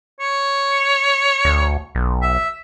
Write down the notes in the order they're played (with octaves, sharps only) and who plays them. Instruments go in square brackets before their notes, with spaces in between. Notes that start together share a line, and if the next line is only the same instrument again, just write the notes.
[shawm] C#5
[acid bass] D2
B1
[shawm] E5